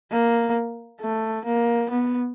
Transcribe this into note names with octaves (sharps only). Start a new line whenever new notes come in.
A#3
A3
A#3
B3